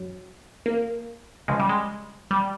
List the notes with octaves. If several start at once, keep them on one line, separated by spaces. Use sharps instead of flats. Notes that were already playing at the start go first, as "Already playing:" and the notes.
Already playing: F#2 F#3
A#3
C#2 C#3 F3 G#3
G3
G#3
G3